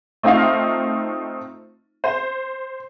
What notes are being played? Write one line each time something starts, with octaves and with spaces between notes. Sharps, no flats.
A3 C4 D#4 F4 F5
C5